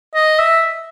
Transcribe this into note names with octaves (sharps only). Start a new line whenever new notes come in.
D#5
E5